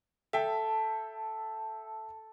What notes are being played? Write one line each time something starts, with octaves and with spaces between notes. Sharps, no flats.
A4 E5 G5 A5